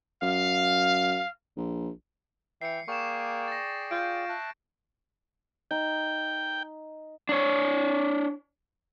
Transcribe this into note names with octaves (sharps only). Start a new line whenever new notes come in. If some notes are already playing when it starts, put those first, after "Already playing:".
F#2 F5
A#1
E3 E5 G5 C7 C#7
A#3 G#4 D5 G5 C#6 E7
A6 A#6
F4 G6 D7
E5 A5 F#6
D#4 G5
D4 C#5